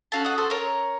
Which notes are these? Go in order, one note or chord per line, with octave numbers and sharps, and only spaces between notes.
C#4 F#4 A4 F5 A5
D#5 F#5
A4 C5
A#4 C#5